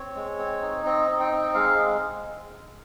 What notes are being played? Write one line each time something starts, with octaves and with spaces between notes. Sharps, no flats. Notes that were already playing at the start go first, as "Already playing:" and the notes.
Already playing: C4 C#5
G#3
C4
D#4
C4 D#5
D#4
G5
C4
G#3 F5